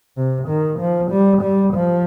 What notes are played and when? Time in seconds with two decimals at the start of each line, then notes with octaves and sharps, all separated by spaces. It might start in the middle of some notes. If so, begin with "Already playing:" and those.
0.17 C3
0.48 D#3
0.79 F3
1.11 G3
1.42 G3
1.74 F3